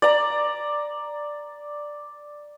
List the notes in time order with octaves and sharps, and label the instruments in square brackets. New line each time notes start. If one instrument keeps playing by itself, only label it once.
[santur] D5 A#5